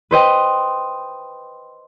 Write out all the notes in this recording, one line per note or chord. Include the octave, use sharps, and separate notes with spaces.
B4 C5 D#5 G5